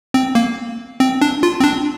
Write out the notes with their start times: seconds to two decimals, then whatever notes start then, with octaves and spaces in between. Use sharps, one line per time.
0.14 C4
0.35 A#3
1.00 C4
1.22 D4
1.43 F4
1.60 C4
1.64 D4